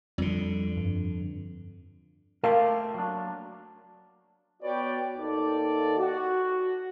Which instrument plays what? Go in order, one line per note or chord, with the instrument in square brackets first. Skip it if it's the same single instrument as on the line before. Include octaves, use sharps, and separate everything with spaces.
[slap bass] F2 D3 [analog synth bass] G3
[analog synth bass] G2
[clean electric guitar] A3 F4 G4 [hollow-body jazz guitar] A#4 F5
[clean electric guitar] F#3 A#3 D4
[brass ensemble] B3 F#4 B4 C#5 D5 G5
D#2 A4 D5
F#4